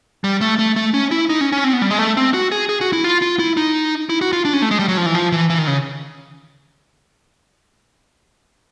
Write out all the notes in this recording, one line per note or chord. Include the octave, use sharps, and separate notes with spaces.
G3
A3
A3
A3
C#4
E4
D#4
C#4
C#4
C4
B3
G3
G#3
A3
C4
F#4
G#4
G#4
F#4
E4
F4
F4
E4
D#4
E4
F#4
F4
D4
C#4
A3
G#3
G3
F#3
F3
E3
F3
E3
E3
D#3
C#3